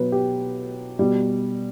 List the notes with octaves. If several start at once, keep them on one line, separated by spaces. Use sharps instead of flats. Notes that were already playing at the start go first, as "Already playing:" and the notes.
Already playing: B2 F#3 B4
G4
B2 G3